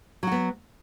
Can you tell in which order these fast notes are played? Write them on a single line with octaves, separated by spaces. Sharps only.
F#3 F#4 B3